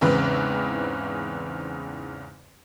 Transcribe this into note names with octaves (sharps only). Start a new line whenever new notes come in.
E2 G#2 C#3 E3 C4 B4